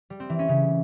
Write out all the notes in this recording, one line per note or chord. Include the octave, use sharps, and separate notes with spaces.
G3
C4
E3
C#4
C#3